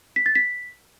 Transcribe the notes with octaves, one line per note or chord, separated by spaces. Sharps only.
B6
A6
B6